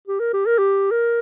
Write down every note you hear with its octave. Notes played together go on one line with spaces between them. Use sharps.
G4
A#4
G4
A#4
G4
A#4